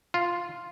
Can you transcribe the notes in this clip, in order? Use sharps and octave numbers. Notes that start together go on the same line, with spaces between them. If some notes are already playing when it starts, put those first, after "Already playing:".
F4